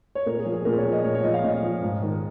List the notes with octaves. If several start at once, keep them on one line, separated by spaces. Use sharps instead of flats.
C#5
A#2 A#4
G#4
F3
G#4
A#2 A#4
C#5
F3
D#5
A#2 C#5
C#5
F3 D#5
F5
A#2 D#5
F3
G#2
D#3